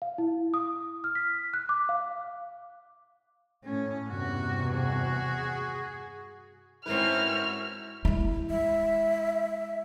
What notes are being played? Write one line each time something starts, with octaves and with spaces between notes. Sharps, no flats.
F5
E4
D#6
F6
B6
F#6
D6
F5
A2 C#4
E2 G2 C3 F#4
F#4 G#4
G#2 C4 C#4 E4 F#4 A#4 B4 F6
G#3 E4
E5